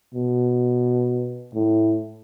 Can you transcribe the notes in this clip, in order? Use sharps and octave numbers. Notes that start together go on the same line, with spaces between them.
B2
A2